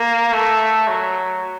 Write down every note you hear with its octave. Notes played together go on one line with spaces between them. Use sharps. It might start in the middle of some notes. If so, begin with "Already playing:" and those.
Already playing: A#3
A3
F#3